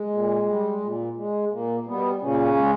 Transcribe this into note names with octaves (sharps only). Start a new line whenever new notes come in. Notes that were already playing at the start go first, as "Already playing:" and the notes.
Already playing: G#3
A#2
G3
A#2
G#3
A#2 A#3
B2 G3 B3
A#2 C#3 C#4
G#3